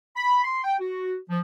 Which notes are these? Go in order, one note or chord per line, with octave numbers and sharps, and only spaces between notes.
B5
C6
G5
F#4
F3